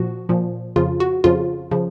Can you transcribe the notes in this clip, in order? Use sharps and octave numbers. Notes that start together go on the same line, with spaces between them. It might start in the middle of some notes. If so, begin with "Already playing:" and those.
Already playing: A#2 F3 F#4
A#2 F3
F2 C#3 F3 F4
F#4
F2 C#3 F3 F4
C#3 F3